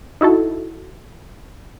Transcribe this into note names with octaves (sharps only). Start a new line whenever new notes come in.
D#4 E4 F#4 A4